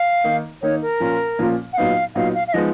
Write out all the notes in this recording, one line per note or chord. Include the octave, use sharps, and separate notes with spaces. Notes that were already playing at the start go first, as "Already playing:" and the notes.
Already playing: F5
D#3 A#3 D#4
D#3 A#3 D#4 C#5
A#4
A#2 F3 A#3 C#4 F4
A#2 F3 A#3 C#4 F4
F#5
A#2 F#3 B3 D#4 F5
A#2 F#3 B3 D#4 F5
F5
F5
F3 G#3 B3 D#4 D#5